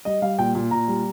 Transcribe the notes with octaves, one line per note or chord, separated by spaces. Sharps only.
G3 D#5
G3 F5
A#2 G5
A#2
A#2 A#5
G3